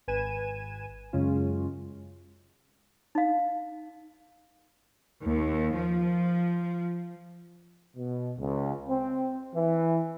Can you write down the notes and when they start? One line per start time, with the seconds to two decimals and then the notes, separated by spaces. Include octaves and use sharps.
0.08 G#1 B4 G#5 G#6 D#7 E7
1.13 F#2 C#3 G#3 C#4 F4
3.15 D#4 F5
5.23 D#2
5.74 F3
7.96 B2
8.39 C#2
8.88 C4
9.55 E3